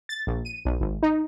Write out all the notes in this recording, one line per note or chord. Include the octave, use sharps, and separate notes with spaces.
A6
A#1
D#7
B1
G#1
D#4